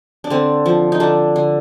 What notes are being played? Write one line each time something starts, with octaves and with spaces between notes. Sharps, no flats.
D4
D3 C4
F3
D#4
D3 D4
D3